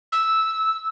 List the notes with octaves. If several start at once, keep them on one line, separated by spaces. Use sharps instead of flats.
E6